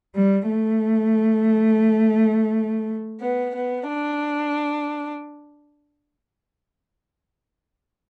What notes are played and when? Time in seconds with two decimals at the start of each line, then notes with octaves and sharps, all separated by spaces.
0.14 G3
0.48 A3
3.20 B3
3.55 B3
3.89 D4